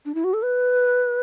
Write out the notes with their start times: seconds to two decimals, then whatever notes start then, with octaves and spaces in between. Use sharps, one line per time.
0.05 D4
0.15 E4
0.24 F#4
0.34 A4
0.43 B4